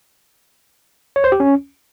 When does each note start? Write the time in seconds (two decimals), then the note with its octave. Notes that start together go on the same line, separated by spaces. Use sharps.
1.16 C#5
1.24 C5
1.32 G4
1.40 C#4